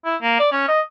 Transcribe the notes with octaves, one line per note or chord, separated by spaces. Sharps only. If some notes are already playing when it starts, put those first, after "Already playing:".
E4
A#3
D5
C#4
D#5